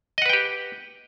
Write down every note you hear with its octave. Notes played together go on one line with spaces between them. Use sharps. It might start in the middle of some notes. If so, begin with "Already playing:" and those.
G4 B4 D#5 F#5 G5